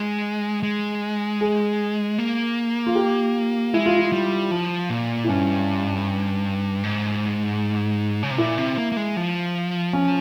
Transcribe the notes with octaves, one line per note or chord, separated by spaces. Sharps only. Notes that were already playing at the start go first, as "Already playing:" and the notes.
Already playing: G#3
G#3
G#4
A#3
F4
G4
G#3 E4
F4
E4
G3
F3
A#2
E4
G2 C#4
G#2
C#3
C3
A#2 E4
C3
A#3
A#3
G#3
F3
C#4